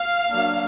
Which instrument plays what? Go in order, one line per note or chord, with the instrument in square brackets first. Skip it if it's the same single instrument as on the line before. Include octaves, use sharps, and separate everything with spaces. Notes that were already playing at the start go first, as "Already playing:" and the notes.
Already playing: [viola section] F5
F#3 A#3 D4